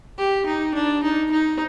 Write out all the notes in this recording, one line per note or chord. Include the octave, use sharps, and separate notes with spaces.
G4
D#4
D4
D#4
D#4